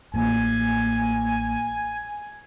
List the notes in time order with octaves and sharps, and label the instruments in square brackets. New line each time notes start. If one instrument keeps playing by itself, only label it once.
[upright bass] A1 A#3 [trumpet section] G#5